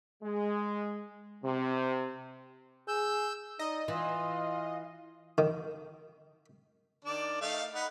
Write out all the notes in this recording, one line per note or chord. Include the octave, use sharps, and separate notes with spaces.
G#3
C3
G#4 E6 G6
D#4 D5 D#5
E3 F4 F5
D#3
D#3 D4 D5
A3 D#4 F5
D#4 F#5 B5